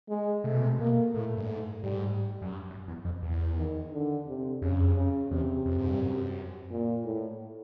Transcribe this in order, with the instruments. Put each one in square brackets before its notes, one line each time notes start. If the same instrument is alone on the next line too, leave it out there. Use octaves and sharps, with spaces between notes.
[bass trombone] G#3
[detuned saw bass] C3 [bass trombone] A3
[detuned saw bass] B2
C3
[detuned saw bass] B2 [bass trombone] A#3
[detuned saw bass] A2 [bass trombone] A3
[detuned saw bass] G2
G#2
[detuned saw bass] G#2 [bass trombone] G3
[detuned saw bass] F#2
G2
F#2
E2
F2
E2
[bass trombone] D#3
D3
C3
[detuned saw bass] F2 [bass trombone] C#3
[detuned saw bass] F#2
F2
[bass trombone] C#3
[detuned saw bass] E2 [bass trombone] C3
[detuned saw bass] F2
G#2
G2
F#2
[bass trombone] A#2
A2